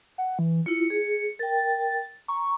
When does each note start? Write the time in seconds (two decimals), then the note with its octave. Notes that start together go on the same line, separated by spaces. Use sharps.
0.18 F#5
0.39 E3
0.66 E4 F4 C#7
0.90 G#4
1.39 A#4 G5 A6
2.28 A#5 C#6